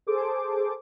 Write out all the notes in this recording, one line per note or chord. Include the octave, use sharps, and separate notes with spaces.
G#4 A4 C5 D6